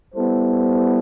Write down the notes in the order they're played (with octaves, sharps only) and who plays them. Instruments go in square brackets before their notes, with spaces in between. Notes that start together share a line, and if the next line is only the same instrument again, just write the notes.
[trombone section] G3 B3 E4 A4 C5